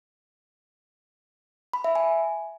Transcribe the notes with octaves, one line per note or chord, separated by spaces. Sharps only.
B5
E5
G#5